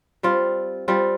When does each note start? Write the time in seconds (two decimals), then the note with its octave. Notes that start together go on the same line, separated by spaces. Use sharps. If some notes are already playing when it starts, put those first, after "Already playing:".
0.23 G3 C4 F4
0.88 G3 C4 F4